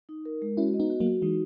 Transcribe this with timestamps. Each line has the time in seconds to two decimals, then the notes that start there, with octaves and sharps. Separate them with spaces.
0.09 D#4
0.25 A#4
0.42 G#3
0.57 C#4 E4 F#4
0.74 D#5
0.80 B3 D#4
0.90 F#4
1.00 F#3 A#3
1.06 F#4
1.22 E3 G#3 D#4